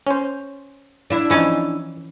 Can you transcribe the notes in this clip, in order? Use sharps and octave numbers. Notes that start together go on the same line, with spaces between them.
C#4 C5
D4 E4
E3 F3 C#4 D#4 A5